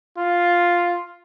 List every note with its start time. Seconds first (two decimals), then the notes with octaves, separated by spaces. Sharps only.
0.18 F4